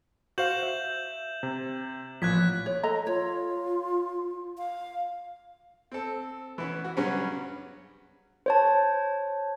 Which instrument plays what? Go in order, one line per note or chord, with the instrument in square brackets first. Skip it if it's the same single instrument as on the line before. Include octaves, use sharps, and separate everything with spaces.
[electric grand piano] F#4 C5 F5 [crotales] G6 E7 F#7
[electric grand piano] E5
C3
[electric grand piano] A1 A#2 [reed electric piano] F3 [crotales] F#6 G#6 B6
[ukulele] C#5
A4 D#5 A#5
[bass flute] F4 [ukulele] C#5
[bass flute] F5
[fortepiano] C4 A4
E3 B3 C#4
F#4
G2 C#3 F#3 G3 B3 C#4
[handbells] C5 C#5 A5